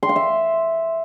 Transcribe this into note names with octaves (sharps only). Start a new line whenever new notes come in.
C6
F5
E5